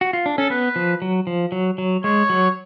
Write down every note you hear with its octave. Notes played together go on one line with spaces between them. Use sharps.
F#4
F4
D4
C#4 A4
B3 B4
F3
F#3
F3
F#3
F#3
G#3 C#5
F#3